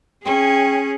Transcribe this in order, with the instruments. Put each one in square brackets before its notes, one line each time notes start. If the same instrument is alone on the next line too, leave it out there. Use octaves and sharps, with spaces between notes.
[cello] C#4 [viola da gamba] G#4 [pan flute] G5